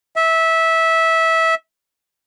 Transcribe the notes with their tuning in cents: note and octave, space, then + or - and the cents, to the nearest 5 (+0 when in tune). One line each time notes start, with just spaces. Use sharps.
E5 -15